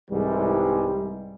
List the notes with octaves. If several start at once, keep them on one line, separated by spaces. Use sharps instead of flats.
C2 G#2 E3 G3 G#3